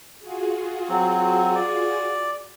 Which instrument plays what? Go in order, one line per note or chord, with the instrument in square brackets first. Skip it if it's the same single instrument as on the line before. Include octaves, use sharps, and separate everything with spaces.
[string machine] F4 F#4 G#4
[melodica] F#3 C4
D5